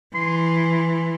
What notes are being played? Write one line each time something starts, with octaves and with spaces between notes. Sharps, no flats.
E3 C6